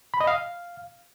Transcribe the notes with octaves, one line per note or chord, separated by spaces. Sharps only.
B5
D#5
F5